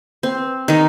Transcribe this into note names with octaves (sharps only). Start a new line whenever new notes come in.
C4
D#3 D#4